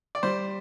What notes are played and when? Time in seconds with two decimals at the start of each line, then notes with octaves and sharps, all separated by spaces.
0.15 D5
0.23 G3 C5